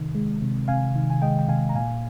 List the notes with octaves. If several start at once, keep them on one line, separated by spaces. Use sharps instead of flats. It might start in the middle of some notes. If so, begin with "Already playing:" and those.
Already playing: C3 D#3
G#3
C3
C3 F5 G#5
D#3
G#5
G#3 D#5 G5
G5
C3 F5 G#5
A#5
A#2 F5 G#5